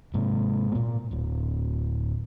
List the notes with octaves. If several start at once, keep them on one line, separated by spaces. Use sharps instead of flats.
G#2 C3
A#2 A#3
D1